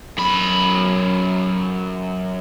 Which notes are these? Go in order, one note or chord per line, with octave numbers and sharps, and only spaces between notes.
F#2 B5